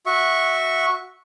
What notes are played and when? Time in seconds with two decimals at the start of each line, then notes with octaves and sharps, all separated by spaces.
0.06 F#4 E5 C#6